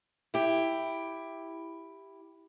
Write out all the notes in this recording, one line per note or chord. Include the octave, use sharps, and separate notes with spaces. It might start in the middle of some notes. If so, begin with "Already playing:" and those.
E4 G4